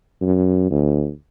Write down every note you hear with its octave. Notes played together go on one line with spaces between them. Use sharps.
F#2
D2